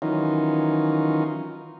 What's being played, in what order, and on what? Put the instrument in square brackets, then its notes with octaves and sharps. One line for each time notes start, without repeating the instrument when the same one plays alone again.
[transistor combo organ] D#3 E3 F#3 C#4 D#4 F4